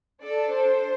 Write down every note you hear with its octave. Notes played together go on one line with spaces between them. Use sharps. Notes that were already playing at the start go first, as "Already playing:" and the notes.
D4 A4 D5
C5